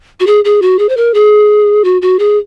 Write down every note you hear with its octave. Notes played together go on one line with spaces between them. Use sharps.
F#4
G#4
G#4
F#4
G#4
C5
A#4
G#4
F#4
F#4
G#4